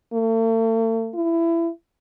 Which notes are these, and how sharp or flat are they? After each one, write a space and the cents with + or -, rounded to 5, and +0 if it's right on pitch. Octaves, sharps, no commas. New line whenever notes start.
A3 +45
E4 +20